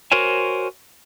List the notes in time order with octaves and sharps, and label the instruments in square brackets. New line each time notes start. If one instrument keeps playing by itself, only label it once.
[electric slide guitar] F#4 A#4 C5 C#5 G#5